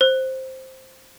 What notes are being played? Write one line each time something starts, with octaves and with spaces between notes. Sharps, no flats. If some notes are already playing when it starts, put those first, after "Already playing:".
C5